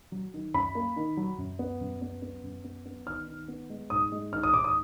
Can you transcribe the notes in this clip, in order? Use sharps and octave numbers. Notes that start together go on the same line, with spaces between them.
F#3
D#3
F#2 B5
A#3
D#3
F#3
F#2
B3
F#2
B3
B3
F#2
B3
B3
D#3 F6
D#3
B3
G#3
G#2 D#6
G#3
D#3 F6
D#6
G#2 D6
D#6